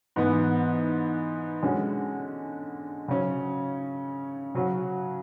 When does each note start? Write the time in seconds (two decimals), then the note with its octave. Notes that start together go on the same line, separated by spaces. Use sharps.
0.16 G#2 E3 B3
1.63 D3 G#3 C#4 F#4
3.08 C#3 F#3 C#4
4.55 C#3 F#3 C#4 F#4